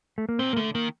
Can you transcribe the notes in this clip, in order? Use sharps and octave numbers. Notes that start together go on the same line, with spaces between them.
A3
A#3
A#2 C4
A#3
D3 A3
D#3 A#3